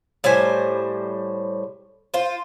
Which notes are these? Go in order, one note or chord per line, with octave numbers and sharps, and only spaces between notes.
A2 G3 C5 G#5
F4 C5